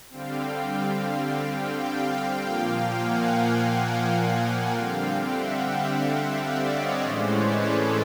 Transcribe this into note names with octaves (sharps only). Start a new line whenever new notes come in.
D3 G3 C4 F5 G5
F5 G5
A#2 F3 A#3
F#5 G#5
F5 G5
D3 G3 C4
E5 F#5
D5 E5
C#5 D#5
A2 E3 G#3 C#4 C5 D5
B4 C#5
A4 B4